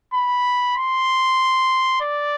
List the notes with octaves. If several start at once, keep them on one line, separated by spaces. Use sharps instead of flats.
B5
C6
D5